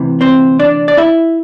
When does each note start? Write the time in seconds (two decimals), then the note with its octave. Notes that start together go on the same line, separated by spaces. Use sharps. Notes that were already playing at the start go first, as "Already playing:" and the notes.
Already playing: D2 C3 E3
0.21 C4 C5
0.59 D4 D5
0.88 D5
0.97 E4 E5